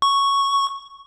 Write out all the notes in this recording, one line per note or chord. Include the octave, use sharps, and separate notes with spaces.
C#6